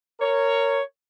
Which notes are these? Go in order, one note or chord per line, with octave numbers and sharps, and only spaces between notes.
A#4 C#5